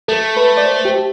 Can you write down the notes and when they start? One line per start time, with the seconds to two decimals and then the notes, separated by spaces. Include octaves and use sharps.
0.08 A3 A4
0.37 B4
0.57 D5
0.66 C5
0.85 G4